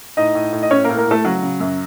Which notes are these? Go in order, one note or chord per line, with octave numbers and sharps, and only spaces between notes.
A2 D#4 D#5
A2
A2
D#5
A2 C#4 C#5
A2 A#3 A#4
A#3 A#4
A2 A3 A4
C#3 F#3 F#4
C#3
F#2